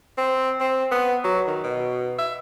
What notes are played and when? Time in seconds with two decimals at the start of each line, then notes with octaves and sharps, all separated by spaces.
0.18 C4
0.60 C4
0.91 B3
1.24 F#3
1.47 D#3
1.63 B2
2.18 E5